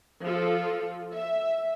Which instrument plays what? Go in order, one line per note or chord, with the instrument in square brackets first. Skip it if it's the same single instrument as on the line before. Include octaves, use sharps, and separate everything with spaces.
[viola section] F3 F4 A4
E5